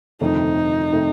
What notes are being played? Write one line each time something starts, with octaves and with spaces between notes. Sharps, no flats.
G1 F2 C3 D#3 A3 D#4
C3 D#3 A3